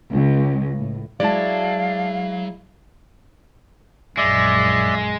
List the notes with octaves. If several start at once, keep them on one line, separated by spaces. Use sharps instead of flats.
C#2
A2
F#3 G#3 E4 D5 F5 A5
A#1 F#2 G#3 D5 E5